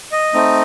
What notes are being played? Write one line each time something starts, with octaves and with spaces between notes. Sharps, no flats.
D#5
A3 C4 D#4